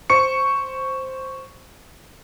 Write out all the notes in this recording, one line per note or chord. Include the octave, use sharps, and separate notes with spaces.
C5 C#6 C#7